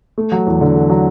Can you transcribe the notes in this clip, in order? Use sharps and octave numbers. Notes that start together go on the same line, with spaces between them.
A3
F#3
E2
D3
A3
F#3